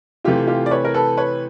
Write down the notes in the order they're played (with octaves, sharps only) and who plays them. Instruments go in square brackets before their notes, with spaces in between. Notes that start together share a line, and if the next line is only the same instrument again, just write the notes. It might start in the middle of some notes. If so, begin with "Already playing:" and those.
[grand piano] C3 E3 A3 C4 [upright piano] F4 G4
[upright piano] F4 G4
D5
B4 C#5
A#4
A4 B4
B4 C#5